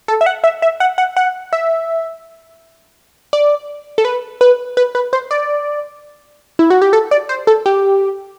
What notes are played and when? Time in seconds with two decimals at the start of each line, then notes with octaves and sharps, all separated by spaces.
0.08 A4
0.21 E5
0.26 F#5
0.44 E5
0.62 E5
0.80 F#5
0.98 F#5
1.17 F#5
1.53 E5
3.33 D5
3.98 A4
4.05 B4
4.41 B4
4.77 B4
4.95 B4
5.13 C5
5.31 D5
6.59 E4
6.70 F#4
6.82 G4
6.93 A4
7.11 D5
7.29 C5
7.47 A4
7.66 G4